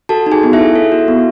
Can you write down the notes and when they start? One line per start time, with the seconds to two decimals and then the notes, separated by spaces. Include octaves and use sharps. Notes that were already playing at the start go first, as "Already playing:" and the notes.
0.09 F#4 A4 A5
0.27 D#4
0.32 G#4 G#5
0.43 B3
0.53 E4 E5
0.59 A4
0.75 A4
0.92 F#4
1.08 B3